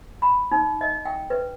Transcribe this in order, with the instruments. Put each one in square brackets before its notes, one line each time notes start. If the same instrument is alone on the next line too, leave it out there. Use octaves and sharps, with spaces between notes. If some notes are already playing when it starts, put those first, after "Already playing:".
[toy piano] B5
D#4
D#5
G5
B4